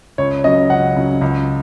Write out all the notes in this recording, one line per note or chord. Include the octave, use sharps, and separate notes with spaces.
C#2 C#5
C#3 F#3 D#5
C#2 F#5
C#3 F#3
C#2